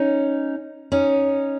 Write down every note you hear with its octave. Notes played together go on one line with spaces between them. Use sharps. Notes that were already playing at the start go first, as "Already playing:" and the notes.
Already playing: C#4 D#4
C#4 D#4